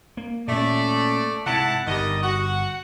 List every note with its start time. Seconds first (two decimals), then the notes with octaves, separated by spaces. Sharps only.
0.17 A#3
0.48 A#2 A3 C#4 D5
1.46 G#2 C3 E4 F#5 A5
1.87 G1 D#3 G3 D#5
2.22 F#4 F#5